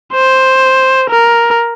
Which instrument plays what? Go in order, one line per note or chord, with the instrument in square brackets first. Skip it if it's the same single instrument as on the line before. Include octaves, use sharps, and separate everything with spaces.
[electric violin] C5
A#4